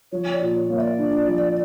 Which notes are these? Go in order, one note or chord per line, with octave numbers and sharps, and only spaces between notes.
F3 C#5
D5
A#2
C#5
A#3
E5
D5
D4
F3